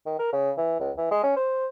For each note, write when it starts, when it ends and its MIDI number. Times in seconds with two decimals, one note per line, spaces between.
0.06 0.18 51
0.19 0.28 70
0.33 0.51 49
0.58 0.76 52
0.80 0.91 37
0.98 1.10 52
1.11 1.22 56
1.24 1.36 61
1.37 1.66 72